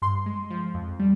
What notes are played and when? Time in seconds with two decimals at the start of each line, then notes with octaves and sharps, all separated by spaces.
0.02 G2 C6
0.26 G#3
0.50 F3
0.74 F2
0.99 G3